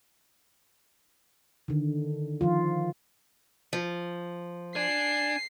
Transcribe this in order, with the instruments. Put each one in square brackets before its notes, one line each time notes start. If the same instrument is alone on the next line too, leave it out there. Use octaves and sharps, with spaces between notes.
[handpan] D3 D#3
D#3 F3 F4
[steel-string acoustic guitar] F3
[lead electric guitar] D4 [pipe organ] G#5 [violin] C7